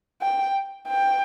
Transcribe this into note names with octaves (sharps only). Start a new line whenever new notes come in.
G5
G5